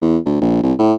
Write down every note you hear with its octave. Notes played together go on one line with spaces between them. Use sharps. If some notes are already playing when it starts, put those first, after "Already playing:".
E2
D2
A#1
C2
A2